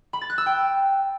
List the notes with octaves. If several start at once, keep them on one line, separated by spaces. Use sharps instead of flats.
B5
A6
F#6
E6
G5